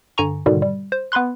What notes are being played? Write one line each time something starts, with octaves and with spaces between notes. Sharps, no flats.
G2 D3 G#5 A#5 C#6
G#2 B2 D3 D#3 G3
G3
C5
B3 B4 B5 C6 F#6